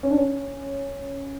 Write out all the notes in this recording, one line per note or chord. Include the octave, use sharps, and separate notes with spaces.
C#4
D4
C#4